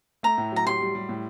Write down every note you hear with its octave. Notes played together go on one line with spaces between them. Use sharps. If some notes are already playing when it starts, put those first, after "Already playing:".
A3 A#5
A2
F#3 A#5
G4 C6
G3
G3
A2